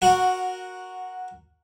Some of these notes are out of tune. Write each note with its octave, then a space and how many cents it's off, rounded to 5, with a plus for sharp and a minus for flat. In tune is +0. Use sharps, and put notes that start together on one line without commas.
F#4 -5 A#4 +0 F#5 -20